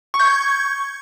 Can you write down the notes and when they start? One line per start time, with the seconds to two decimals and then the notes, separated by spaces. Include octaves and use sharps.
0.14 C#6
0.20 G6
0.25 G#6